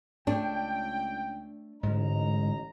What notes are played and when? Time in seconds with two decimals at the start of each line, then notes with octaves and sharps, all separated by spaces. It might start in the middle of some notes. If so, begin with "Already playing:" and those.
0.27 C#2 A3 D4 G5
1.83 A1 G#2 D3 G#3 D#4 A#5